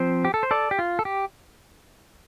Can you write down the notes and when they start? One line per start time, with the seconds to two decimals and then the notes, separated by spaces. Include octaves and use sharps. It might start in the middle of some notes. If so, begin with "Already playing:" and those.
Already playing: F3 C4 C5
0.25 G4
0.34 A4
0.43 C5
0.51 A4 D5
0.71 G4
0.79 F4
0.99 A4
1.05 G4